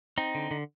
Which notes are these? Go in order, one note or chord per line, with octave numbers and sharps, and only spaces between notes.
C4 D#4
D3
D3